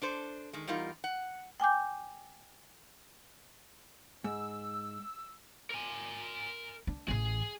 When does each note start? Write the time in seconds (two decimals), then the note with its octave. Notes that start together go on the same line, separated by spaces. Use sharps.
0.02 D4 A4 C5
0.53 D#3 G#3
0.67 E2 G3 D#4 F4 A#4
1.04 F#5
1.60 G5 G#5 D6 G6
4.24 G#2 E6
5.70 A#4 G#5
6.87 D4
7.08 A1 E3 G#4